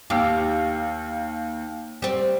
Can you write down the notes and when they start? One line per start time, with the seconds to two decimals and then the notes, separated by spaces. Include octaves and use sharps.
0.10 D#2 G4 F5 E6
2.02 G3 C4